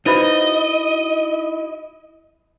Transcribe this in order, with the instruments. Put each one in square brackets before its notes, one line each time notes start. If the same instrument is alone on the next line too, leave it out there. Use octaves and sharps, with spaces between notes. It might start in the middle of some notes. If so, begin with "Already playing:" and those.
[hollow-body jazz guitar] D#4 E4 F#4 [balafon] B4 C5 B5 [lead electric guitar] D#5